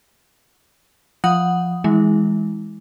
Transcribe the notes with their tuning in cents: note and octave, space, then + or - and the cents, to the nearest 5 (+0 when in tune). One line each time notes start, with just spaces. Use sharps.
F3 +0 F#5 -5 D#6 +0
E3 -10 G#3 +0 E4 -35